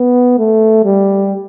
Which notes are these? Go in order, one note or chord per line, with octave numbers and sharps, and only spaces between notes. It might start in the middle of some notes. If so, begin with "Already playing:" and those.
Already playing: B3
A3
G3